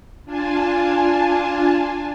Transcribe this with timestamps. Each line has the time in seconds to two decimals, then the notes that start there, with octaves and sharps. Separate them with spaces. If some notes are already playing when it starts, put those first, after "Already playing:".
0.25 D4 F4 G#5 A5